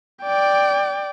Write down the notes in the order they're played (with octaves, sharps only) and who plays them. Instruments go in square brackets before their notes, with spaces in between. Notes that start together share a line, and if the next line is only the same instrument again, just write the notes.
[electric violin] D5 G5